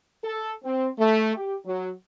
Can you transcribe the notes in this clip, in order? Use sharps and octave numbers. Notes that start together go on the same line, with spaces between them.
A4
C4
A3
G4
F#3